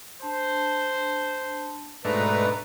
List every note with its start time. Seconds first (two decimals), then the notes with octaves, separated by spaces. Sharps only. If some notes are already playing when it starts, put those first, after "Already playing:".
0.22 D4 C5 A5
2.05 G#2 B2 A3 D4 B4 A#5